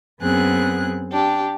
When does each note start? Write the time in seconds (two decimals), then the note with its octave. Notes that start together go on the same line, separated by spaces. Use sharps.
0.21 F#2 B3 C4 G#4 F#6
1.12 D4 G4